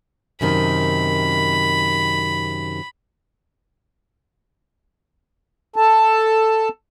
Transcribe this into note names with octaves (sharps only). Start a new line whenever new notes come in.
F#2 C3 D#3 B5
A4 A5